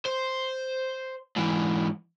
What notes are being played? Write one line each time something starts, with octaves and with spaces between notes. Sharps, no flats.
C5
G#2 E3